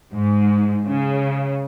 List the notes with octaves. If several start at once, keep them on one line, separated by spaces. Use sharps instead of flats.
G#2
C#3